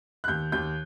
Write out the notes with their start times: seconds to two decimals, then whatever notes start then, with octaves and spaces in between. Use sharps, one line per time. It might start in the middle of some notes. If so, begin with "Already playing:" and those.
0.24 F#6
0.28 D#2 G6
0.52 D#2 G6